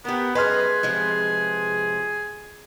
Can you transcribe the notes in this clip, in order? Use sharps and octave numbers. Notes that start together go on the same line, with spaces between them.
B3 G4 A#4
F#2 G#4 B4 D#5 C6 F6
C3 F3 G#3